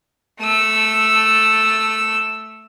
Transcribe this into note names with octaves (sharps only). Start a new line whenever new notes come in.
A3 E6